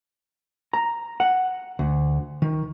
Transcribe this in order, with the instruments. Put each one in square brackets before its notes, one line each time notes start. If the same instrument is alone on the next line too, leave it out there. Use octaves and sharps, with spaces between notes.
[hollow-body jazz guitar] A#5
F#5
D2
D#3